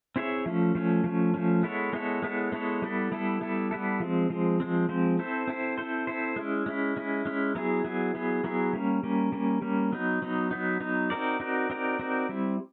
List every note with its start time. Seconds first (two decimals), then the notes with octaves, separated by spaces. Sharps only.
0.16 C4 E4 G#4 C#5 E5
0.46 F3 A3 C#4
0.75 F3 A3 C#4
1.04 F3 A3 C#4
1.34 F3 A3 C#4
1.63 G#3 B3 E4 A4 C#5
1.93 G#3 B3 E4 A4 C#5
2.22 G#3 B3 E4 A4 C#5
2.52 G#3 B3 E4 A4 C#5
2.82 G3 B3 E4 A4
3.12 G3 B3 E4 A4
3.41 G3 B3 E4 A4
3.71 G3 B3 E4 A4
4.00 F3 G#3 C4
4.30 F3 G#3 C4
4.60 F3 G#3 C4
4.89 F3 G#3 C4
5.19 C4 E4 A4 C5
5.47 C4 E4 A4 C5
5.78 C4 E4 A4 C5
6.07 C4 E4 A4 C5
6.36 G#3 C#4 E4
6.66 G#3 C#4 E4
6.97 G#3 C#4 E4
7.25 G#3 C#4 E4
7.55 F#3 B3 E4 G#4
7.85 F#3 B3 E4 G#4
8.15 F#3 B3 E4 G#4
8.44 F#3 B3 E4 G#4
8.73 G3 A#3 C#4
9.03 G3 A#3 C#4
9.32 G3 A#3 C#4
9.62 G3 A#3 C#4
9.92 F#3 B3 D#4
10.22 F#3 B3 D#4
10.51 F#3 B3 D#4
10.81 F#3 B3 D#4
11.10 C4 D#4 F#4 A#4 D5
11.40 C4 D#4 F#4 A#4 D5
11.70 C4 D#4 F#4 A#4 D5
11.99 C4 D#4 F#4 A#4 D5
12.29 G3 C4 E4